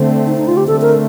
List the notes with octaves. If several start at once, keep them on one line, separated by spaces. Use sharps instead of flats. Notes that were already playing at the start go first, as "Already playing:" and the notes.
Already playing: D3 A3 C4
D#4
D#4
F4
G4
D3 A3 C4 A4
A#4